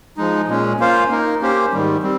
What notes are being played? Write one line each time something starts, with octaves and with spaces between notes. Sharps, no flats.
F3 G#3 D#4
A#2 G#3 C#4
A#3 C#4 F4 C5 F5
A#3 D#4 A#4
A#3 C#4 G4 C5
G#2 D#3 G3
G3 C4